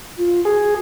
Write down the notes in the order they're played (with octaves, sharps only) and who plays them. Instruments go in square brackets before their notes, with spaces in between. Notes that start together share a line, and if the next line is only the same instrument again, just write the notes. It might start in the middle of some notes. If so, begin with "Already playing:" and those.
[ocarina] F4
[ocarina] F#4 [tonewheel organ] G#4